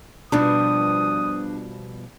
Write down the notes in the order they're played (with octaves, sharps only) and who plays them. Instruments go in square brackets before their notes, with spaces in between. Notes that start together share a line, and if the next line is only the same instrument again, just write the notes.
[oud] B2 F3 G3 [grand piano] D4 [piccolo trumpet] D#6